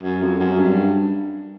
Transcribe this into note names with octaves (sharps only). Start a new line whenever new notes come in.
F#2
F2
F#2
G2